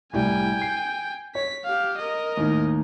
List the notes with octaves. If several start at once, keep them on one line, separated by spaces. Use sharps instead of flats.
C2 A2 G3 G5 G#5
C7
C#5 B6
G4 F5
A#4 D#5
D#2 A2 D#4